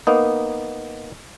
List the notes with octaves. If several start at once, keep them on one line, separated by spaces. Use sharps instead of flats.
A#3 B3 D#4